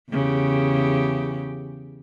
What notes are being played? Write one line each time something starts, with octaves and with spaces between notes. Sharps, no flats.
E2 C#3 G4